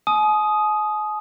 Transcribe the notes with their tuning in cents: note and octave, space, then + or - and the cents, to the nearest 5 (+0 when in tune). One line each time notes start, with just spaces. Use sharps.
G#5 +45 C6 +0 D#6 +0